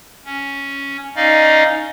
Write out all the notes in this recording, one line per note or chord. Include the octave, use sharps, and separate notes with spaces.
C#4
C#4 D#4 D5 D#5 F5